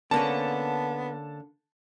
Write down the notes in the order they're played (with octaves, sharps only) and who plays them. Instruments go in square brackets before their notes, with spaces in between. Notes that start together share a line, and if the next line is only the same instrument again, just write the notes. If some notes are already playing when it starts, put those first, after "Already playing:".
[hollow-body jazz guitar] D3 A#3 C#4 [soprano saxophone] B3 [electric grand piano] A5